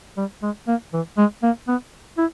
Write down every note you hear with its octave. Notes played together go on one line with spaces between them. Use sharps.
G3
G#3
A#3
E3
G#3
A#3
B3
E4